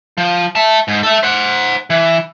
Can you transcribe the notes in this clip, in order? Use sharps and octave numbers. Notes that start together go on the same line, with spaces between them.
F3
E5 A5
G#2
A4 E5
C5 F#5
E3